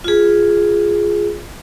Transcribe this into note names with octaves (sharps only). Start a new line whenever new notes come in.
F4 G#4